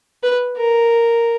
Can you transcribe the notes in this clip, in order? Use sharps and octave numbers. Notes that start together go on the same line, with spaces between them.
B4
A#4